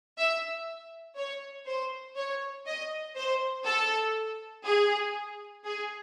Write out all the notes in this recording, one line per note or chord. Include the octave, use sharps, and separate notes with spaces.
E5
C#5
C5
C#5
D#5
C5
A4
G#4
G#4